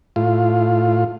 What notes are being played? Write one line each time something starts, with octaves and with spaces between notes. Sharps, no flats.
A2 F4